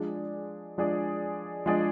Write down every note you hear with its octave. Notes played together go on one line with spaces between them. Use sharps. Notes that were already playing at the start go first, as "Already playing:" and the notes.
Already playing: F3 G#3 D4 G#4 D5
F3 G#3 D4 G#4 D5
F3 G#3 D4 G#4 D5